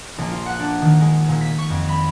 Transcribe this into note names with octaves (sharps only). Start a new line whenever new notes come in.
A#1
F4
F#5
D4
D#3
G#3
A#2
B6
C#6
F2
B5